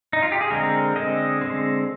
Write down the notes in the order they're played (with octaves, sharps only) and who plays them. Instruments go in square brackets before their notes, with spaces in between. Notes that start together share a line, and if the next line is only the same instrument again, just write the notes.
[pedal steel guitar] D#4
F4
G4
G#4
D3 G#3 C4 A#4
D3 G#3 C4 D#5
D3 G#3 C4